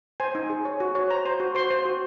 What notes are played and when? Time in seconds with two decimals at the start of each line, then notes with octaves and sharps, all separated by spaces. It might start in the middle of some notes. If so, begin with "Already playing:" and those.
0.20 C5 G#5
0.35 D#4
0.50 G#4
0.65 C#5
0.80 F#4
0.95 C#5
1.10 C5 A#5
1.26 C5
1.40 F#4
1.55 C5 C6
1.70 C5
1.85 F#4